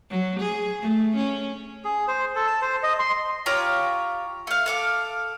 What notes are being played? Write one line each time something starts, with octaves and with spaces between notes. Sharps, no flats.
F#3
G#4
A3
C#4
G#4
C5
A4
A5
C5
D#5
C6
F4 G4 C#5 A#5
A3 F5
A4 F5 D6